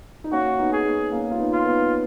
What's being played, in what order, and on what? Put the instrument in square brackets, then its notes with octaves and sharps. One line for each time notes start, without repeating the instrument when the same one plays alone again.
[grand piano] D#4
[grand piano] A#3 C#4 [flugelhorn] F#4
[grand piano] B3 D#4
[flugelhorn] G#4
[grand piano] B3 D#4
A#3 C#4
F4
B3 D#4
[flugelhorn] F4
[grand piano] B3 D#4